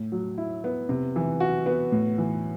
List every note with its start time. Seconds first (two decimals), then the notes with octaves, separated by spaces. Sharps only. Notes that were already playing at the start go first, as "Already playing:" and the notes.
Already playing: A2
0.12 F#3
0.38 E4
0.64 B3
0.89 C3
1.16 E3
1.40 F#4
1.66 B3
1.92 A2
2.18 E3